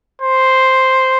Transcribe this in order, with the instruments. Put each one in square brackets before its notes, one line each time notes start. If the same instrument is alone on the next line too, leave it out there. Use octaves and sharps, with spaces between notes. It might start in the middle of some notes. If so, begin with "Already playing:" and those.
[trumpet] C5